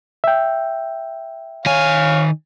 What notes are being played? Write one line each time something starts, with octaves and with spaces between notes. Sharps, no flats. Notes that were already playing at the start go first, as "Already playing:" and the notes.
E5 G5
D#3 C#5 F5 G#5